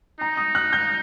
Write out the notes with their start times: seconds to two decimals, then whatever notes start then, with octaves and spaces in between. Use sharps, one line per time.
0.20 D#4 A#5
0.37 D#6
0.55 F#6
0.73 G6